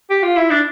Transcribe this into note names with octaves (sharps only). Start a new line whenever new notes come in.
G4
F4
E4
D4